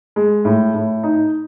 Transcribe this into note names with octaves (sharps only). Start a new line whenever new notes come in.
G#3
A2
A2
D#4